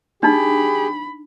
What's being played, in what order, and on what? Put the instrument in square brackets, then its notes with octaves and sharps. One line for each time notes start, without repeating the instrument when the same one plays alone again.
[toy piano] D4 D#4 [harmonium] G4 G#4 [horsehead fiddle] B5